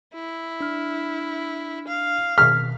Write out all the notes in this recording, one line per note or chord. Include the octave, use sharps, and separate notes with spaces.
E4
D4 F6
F5
B2 D#3 F6 B6